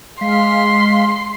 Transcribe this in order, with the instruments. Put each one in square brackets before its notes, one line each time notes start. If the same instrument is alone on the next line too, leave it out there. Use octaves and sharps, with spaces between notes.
[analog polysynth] G#3 F5 B6 [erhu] C6